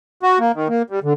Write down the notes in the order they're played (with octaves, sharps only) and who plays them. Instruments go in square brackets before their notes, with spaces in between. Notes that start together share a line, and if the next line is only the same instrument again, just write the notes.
[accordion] F#4
A#3
D#3
A#3
G3
D3